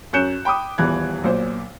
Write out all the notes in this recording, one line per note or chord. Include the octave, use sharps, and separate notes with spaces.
F#2 C#4 F#6 G6 C#7 E7
G5 B5 D6 D#6
D#1 E2 E3 F#6 G#6
B1 A#2 C5